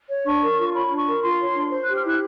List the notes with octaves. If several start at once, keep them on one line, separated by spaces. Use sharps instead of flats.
C#5
D4 C#6
A#4
F4
C#5 B5
D4
C#6
A#4
F4 C6
C#5
D4
C5
G4 F#6
F6
E4 F#6